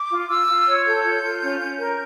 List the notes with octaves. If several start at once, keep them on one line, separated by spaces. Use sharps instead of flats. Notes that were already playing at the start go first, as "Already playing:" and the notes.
Already playing: D6
F4
F4 E6
F4
C#5
A4 G6
F4
F4
C#4
C#4
A#4